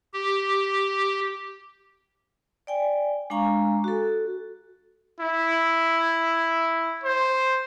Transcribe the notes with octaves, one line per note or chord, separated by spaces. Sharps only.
G4
D5 G5 G#5
G#3 D4 F5 G#5 A#5 C#6
F#4 A4
E4
C5